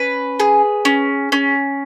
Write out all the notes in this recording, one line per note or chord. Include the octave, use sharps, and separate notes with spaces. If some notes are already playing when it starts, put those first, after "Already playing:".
Already playing: C#4 B4
G#4
C#4
C#4